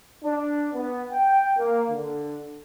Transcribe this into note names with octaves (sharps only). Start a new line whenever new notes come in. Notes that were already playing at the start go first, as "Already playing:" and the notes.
D4
B3
G5
A#3
D3